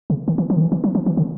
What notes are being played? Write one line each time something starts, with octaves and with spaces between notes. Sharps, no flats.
C#3
D#3
E3
F3
D#3
E3
E3
F#3
F3
E3
D3